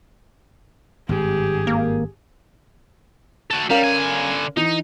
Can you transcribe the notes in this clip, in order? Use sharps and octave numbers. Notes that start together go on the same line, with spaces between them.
G#1 G2 G4 G#4
A#3
F#4 A4
G3 C#4 A#4 F5
D3 G#5
E3 D#4